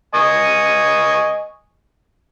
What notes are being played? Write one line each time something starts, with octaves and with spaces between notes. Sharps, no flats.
D#5 G#5 C#6